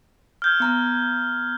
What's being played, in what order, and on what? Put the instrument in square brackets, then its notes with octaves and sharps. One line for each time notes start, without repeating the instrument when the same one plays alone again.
[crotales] F6 G6 G#6
[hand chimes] B3 A#5 F#6